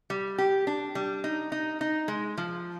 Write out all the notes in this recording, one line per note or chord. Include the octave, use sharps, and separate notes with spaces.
G3
G4
D4
G3
D#4
D#4
D#4
G#3
F3